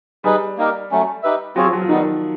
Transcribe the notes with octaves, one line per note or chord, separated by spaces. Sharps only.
G3 D#4 G#4 B4
A#3 D#4 G4 A#4
F#3 A3 C#4
D#4 G4 B4 E5
F#3 C4 F4 G#4 C#5
F3
F#3
F3
D#3 G3 B3 D#4